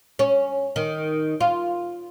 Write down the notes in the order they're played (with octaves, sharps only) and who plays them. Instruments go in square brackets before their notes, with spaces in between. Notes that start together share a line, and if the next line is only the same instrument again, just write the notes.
[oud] C#4
D#3
F4